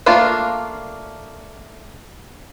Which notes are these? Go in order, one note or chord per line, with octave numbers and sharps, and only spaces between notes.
A3 A#3 D4 F4 A#4